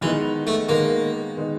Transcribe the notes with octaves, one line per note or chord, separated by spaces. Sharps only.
D#3 E3 G#3 B3 D#4
A3
D#3 G#3 A#3 B3 D#4
D#3 G#3 B3 D#4